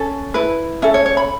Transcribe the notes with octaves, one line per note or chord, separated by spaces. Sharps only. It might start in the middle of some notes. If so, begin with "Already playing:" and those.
Already playing: C#4 A4
E4 B4
C#4 A4 E5
C#5
C#5
B5